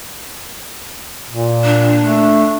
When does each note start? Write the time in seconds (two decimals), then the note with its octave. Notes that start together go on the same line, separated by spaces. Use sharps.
1.28 A#2
1.64 D4
1.99 A3